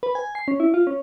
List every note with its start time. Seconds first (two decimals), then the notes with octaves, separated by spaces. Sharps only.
0.03 B4
0.15 G#5
0.35 C7
0.48 C#4
0.60 E4
0.74 F4
0.87 C#4